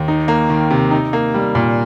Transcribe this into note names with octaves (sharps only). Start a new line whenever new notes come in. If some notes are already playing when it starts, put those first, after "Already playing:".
Already playing: D#2
D#4
A#3
D#3
C3
D#4
A#3
G3
A#2